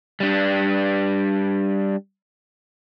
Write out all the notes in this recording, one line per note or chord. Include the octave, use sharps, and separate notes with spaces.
G3 D4